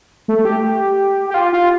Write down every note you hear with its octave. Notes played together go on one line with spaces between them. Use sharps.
A3
G4
G4
F4
F4